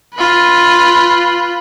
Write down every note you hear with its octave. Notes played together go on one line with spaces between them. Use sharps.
F4 B4